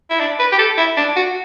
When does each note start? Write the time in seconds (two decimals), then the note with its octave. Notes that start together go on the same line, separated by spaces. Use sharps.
0.10 E4
0.20 D4
0.39 B4
0.52 G4
0.59 A4
0.78 E4
0.97 D4
1.16 F#4